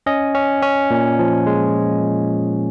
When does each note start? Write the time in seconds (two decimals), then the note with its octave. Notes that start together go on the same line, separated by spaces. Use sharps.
0.06 C#4 D#5
0.35 C#4
0.62 C#4
0.91 A#2
1.19 F3
1.47 G#3